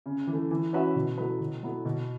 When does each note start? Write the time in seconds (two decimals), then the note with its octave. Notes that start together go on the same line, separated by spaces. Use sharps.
0.06 C#3
0.27 E3 A3
0.51 E3
0.73 C#4 F#4 B4 E5
0.96 B2
1.18 F#3 A3 E4 B4
1.41 B2
1.62 F#3 B3 E4 A4
1.85 B2